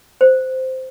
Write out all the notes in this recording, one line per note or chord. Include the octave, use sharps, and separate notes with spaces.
C5